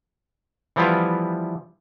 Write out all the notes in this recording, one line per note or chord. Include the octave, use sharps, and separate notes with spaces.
E3 F3 G3 B3 E4 F4